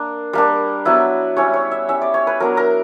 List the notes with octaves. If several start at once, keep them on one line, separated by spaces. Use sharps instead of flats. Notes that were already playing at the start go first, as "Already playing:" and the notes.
Already playing: A#3 D4
G3 A#3 D4
F#3 B3 E4
G3 C#4 E4 C#5
C#5
E5
G3 C#4 E4 E5
D5
C#5
B4
F#3 B3 D4 A#4
A#4